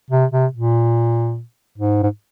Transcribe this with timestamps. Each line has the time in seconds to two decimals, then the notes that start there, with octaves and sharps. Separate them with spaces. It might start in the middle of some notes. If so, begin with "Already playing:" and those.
0.11 C3
0.31 C3
0.53 A#2
1.78 G#2
2.03 G#2